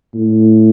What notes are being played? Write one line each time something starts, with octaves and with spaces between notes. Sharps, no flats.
A2